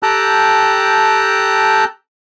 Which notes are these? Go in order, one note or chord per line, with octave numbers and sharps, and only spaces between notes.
G4 A4 G5 A5 A#5 F#6